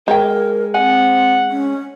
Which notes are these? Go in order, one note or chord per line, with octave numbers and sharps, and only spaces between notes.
G#3 A#4 C5 C#5 G5
C4 F#5 G#5
C#4